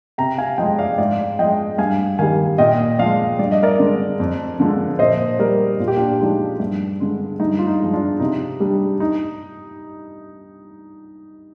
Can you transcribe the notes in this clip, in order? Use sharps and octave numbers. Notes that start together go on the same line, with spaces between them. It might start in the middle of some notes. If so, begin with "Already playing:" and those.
C3 G5 A#5
F5 G#5
F3 G#3 D#5 G5
D5 F5
G#2 D5 F5
F3 G#3 D#5 G5
G2 F5 G#5
D#3 G3 F5 G#5
A#2 D#5 G5
F3 G#3 D5 F5
G2 D5
D#5
A#4 D5
D3 G#3
F2
D3 F3 G#3
A#2 C5 D#5
G3 A#4 D5
A#2 F4
G4
D4 F4
F3 G#3 D#4
G2
D3 G#3
G2 D#4
F4
D#4
F3 G#3
D4 F4
C3 D#4
G3 D4
D#4